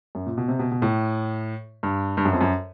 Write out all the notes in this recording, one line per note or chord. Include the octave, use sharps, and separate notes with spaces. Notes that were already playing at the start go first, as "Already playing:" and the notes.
F#2
A#2
B2
C3
B2
B2
A2
G2
G2
F#2
F2
F#2